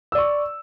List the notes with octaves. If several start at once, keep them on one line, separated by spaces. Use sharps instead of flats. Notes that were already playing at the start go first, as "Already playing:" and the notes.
D5 C#6 E6